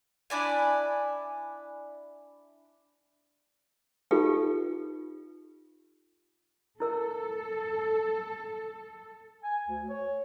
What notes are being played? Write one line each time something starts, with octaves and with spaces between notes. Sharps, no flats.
D4 E4 D5 G#5
D#4 F4 G4 A4 B4
E4 A4 A#4 E6
G#5
D2
C#5